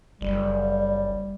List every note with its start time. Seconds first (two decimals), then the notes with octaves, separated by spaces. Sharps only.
0.21 F#1 G3